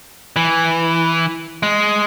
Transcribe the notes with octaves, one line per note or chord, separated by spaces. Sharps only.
E3
G#3